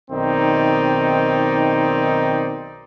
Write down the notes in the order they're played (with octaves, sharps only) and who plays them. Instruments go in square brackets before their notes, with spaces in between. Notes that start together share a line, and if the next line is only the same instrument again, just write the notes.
[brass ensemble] B1 D#3 C4 D#4 D5